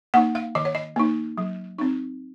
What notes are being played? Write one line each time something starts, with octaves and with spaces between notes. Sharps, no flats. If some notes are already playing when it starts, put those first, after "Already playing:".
A#3 D#4 F#5
F5
D#3 D#5
C#5
D#5
A#3 D#4
F#3
C4 D#4